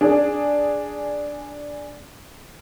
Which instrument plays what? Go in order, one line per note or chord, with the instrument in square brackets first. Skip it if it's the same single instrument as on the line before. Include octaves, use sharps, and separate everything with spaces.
[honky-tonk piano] D4 G#4